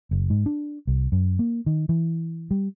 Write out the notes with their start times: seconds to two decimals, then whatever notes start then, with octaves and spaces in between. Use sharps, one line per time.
0.11 F#1
0.30 G#2
0.46 D4
0.87 C2
1.12 F#2
1.39 A#3
1.66 D#3
1.89 E3
2.51 G3